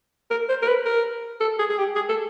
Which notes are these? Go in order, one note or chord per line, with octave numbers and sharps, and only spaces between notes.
A#4
C5
A#4
B4
A#4
A4
G#4
G#4
G4
G#4
A4